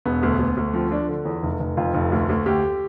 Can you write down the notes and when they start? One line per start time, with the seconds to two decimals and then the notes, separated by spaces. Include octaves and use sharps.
0.05 E1 B3
0.23 D2
0.39 D2
0.57 D2
0.74 F3 C4
0.91 F3 D4
1.08 D3
1.25 E2
1.43 F1
1.60 F1
1.77 F2 F4
1.94 F1
2.12 D2
2.29 D2
2.46 D2 G4